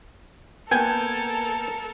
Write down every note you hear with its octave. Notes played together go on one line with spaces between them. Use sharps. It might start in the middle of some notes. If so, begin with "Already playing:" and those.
A#3 B3 A4 A#4 G5 G#5